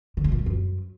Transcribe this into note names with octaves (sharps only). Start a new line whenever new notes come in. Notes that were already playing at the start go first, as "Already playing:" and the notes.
D3
G#2
A#2
G3
F#2